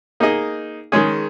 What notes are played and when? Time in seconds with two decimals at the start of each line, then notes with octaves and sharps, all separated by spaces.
0.20 A#3 D#4 G#4 D#5
0.92 D#3 G#3 C#4 G#4